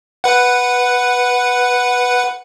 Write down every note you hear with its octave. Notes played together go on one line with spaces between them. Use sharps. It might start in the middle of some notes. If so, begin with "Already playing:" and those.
B4 F#5